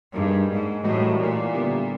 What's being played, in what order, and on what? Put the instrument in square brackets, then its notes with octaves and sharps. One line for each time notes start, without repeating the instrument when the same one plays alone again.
[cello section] G2 [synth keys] A#3 D#4 G#4
[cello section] G#2
[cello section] A2 [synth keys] E3 G3 A#3 D#4 F#4
[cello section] A#2
[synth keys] D3 G3 B3 E4 G4